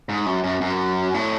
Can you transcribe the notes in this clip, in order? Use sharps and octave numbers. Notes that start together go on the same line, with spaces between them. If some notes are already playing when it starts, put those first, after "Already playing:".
G#2
F#2
F#2
F#2
A2